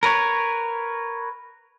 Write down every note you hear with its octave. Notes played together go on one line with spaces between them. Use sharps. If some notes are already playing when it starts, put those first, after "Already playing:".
A#4 B4 C#5